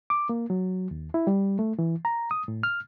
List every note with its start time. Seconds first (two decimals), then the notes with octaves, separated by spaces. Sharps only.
0.10 D6
0.29 A#3
0.50 F#3
0.91 D#2
1.14 E4
1.27 G3
1.59 A3
1.79 E3
2.05 A#5
2.31 D#6
2.48 A2
2.63 F6